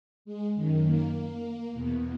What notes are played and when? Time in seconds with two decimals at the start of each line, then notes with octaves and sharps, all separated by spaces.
0.25 G#3
0.55 F#2 D#3
0.85 A#3
1.72 E2 B2